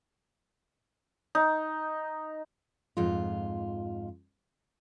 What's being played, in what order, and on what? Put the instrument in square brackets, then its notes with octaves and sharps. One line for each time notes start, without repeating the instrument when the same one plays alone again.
[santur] D#4
[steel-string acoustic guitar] F2 G#2 F4